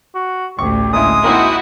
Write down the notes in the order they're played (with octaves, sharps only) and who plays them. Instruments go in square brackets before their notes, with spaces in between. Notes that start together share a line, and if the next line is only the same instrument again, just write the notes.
[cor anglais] F#4
[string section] A1 D2 [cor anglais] G4 [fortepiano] C#6
[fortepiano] A#2 E4 [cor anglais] G#3 [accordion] D#6
[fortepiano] A#3 C4 C5 [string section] D#4 E4 F#4